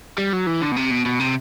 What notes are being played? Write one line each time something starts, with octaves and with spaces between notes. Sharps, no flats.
G3
F#3
E3
D3
B2
C3
B2
B2
C3